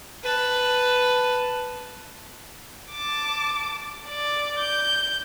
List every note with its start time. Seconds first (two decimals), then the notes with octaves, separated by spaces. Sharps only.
0.23 B4 A5
2.91 A5 D6
4.08 D5
4.59 G6